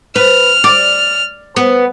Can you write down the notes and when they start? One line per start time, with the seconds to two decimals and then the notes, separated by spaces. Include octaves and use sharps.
0.16 B4 F6
0.64 D5
1.56 B3